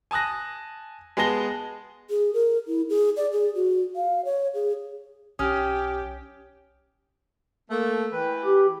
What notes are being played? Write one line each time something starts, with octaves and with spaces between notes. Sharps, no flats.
G#5 A5 D#6 F#6 A#6
G#3 B3 G#4 A5 A#6 G7
G#4
A#4
E4
G#4
D5
G#4
F#4
F5
C#5
G#4
B1 C#4 G4 D#6 F6
A3 A#3 A4
E3 B4 G5
G4